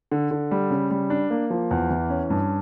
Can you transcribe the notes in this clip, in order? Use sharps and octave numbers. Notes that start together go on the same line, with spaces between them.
D3
D3
G3
C#3
G3
D4
A#3
F3
E2
E3
C#4
G2